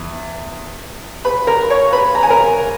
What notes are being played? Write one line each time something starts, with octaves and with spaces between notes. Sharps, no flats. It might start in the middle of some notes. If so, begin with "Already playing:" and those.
Already playing: E2
B4 B5
A#4 A#5
C#5 C#6
B4 B5
A#5
G#5
A#4 A#5